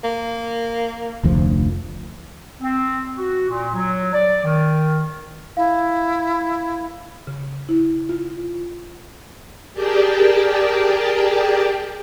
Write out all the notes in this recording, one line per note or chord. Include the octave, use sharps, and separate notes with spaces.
A#3
F1 D2 F3
C4
F#4
A#2
F#3
D5
D#3
E4 F5
C#3
E4
F4
G4 G#4 A#4 D5 G5 A5